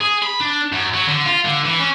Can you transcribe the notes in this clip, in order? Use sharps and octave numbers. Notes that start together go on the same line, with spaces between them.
G#4
B5
D4
F#2
F#3
D3
F4
D3
E3
C#4